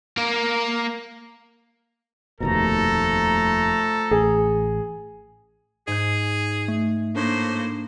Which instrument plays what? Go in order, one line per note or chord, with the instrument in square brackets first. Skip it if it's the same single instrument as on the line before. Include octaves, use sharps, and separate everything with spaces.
[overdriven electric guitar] A#3 A#4
[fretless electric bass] F1 D#2 B2 [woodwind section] F3 A3 A#5 [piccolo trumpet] A4
[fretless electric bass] A1 [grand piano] G#4
[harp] G#2 G6 [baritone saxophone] G#4
[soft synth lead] A3
[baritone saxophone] A2 [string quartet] A#3 C5 [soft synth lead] D4